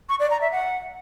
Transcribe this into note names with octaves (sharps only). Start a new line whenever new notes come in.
C#6
D5
A#5
E5
F#5